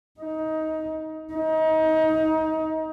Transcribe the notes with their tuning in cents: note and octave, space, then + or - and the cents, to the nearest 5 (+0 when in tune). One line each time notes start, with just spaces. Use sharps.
D#4 +20
D#4 +25